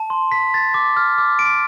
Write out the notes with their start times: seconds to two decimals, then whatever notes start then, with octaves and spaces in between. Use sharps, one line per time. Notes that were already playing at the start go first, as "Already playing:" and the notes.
Already playing: A5
0.10 C6
0.32 B6
0.54 A6
0.74 D6
0.97 F6
1.18 D6
1.39 D7